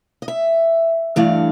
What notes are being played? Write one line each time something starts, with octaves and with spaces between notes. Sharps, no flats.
D#5
E5
G2 E3 A3 D4 F5